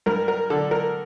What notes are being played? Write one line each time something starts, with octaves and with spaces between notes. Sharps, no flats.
G2 A#4
A#4
D3 A4
A#4